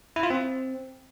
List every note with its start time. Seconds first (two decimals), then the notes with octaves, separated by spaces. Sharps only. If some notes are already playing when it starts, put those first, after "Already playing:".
0.16 E4
0.23 F4
0.30 C4